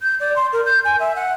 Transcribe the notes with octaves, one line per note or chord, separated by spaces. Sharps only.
G6
D5
C6
A#4
G6
G#5
E5
F#5